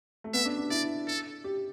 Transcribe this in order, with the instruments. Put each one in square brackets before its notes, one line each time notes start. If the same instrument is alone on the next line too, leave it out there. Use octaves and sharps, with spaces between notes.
[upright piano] A3
[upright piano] B3 [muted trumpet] E5
[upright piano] D4
D4
[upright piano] E4 [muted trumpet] D5
[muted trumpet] A4
[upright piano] G4